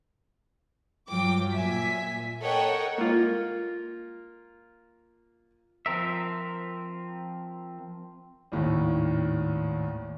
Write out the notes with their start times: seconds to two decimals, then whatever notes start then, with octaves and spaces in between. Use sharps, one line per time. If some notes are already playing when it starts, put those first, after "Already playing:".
1.09 G2 F#3 F4 G5 D6
1.52 A#2 E5 G#5 B6
2.42 A4 A#4 C#5 D#5 F#5 G5
2.98 A#3 F4
5.86 F3 C4 A#4 E5
8.52 G#1 D#2 A2